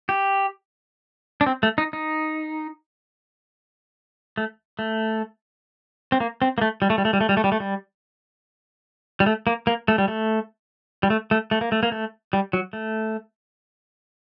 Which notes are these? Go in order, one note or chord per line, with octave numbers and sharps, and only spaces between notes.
G4
D4
C4
A3
D#4
D#4
A3
A3
C4
A#3
C4
A#3
A3
G3
A3
G3
A3
G3
A3
G3
A3
G3
A3
G3
G3
A3
A#3
A#3
A3
G3
A3
G3
A3
A3
A3
A#3
A3
A#3
A3
G3
F#3
A3